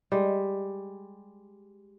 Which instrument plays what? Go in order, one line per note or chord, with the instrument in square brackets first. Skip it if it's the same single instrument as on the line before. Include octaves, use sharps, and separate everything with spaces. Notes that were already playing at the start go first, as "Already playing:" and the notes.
[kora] G3 G#3